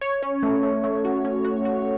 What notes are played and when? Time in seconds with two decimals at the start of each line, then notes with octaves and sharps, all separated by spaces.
0.01 C#5
0.22 C#4
0.43 A3
0.63 A3
0.84 A3
1.05 F#4
1.25 C#4
1.45 F#4
1.65 F#4